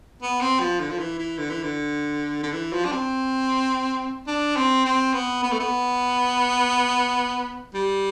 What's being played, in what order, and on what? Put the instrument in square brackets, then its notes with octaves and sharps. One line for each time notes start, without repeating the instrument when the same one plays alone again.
[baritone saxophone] B3
C4
F3
D3
F3
E3
E3
D3
E3
D3
D3
E3
F3
D4
C4
D4
C4
C4
B3
B3
A3
B3
G3